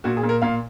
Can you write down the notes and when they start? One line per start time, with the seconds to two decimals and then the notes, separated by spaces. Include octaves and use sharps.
0.04 A#2 F#4
0.17 G#4
0.23 A#2
0.29 A#4
0.42 A#2 F5